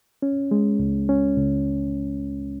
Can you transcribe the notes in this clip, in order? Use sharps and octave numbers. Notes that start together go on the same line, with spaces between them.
C#4
G#3
C#2
C#4
C#2